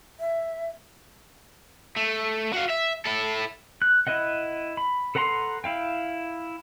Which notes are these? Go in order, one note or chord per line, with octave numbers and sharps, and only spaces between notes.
E5
A3
F#4 F5
E5
E4 A4
F#6
E4 B4 D#5 F#5
B5
A4 B4 F#5 A#5 C6
E4 F5 G5